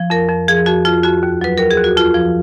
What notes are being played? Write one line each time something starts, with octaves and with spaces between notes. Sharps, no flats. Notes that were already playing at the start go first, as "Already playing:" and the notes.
Already playing: F3
F2 A#4
F2
F3 G#4
F2 F#4
F2 F4
F2 F#4
D#2
F#3 B4
D#2 A#4
G#4
D#2
F#4
F2 F4
F3